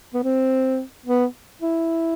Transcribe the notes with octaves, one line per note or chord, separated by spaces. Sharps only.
B3
C4
B3
E4